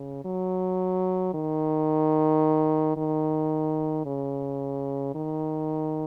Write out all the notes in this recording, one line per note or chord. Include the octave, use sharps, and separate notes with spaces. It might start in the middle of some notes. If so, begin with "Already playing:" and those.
Already playing: C#3
F#3
D#3
D#3
C#3
D#3